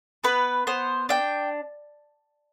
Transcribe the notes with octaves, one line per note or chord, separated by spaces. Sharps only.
B3 B4
B3 C5
D4 G5